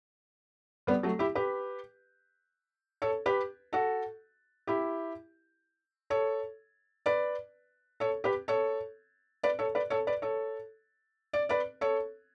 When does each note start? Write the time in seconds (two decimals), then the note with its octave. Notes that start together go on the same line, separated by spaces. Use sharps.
0.87 G3 B3
1.03 F#3 A3
1.19 E4 G4
1.35 G4 B4
3.02 A4 C#5
3.26 G4 B4
3.73 F#4 A4
4.67 E4 G4
6.10 A4 C#5
7.06 B4 D5
8.00 A4 C#5
8.24 G4 B4
8.48 A4 C#5
9.43 B4 D5
9.59 A4 C#5
9.75 B4 D5
9.90 A4 C#5
10.07 B4 D5
10.22 A4 C#5
11.33 D5
11.49 B4 D5
11.81 A4 C#5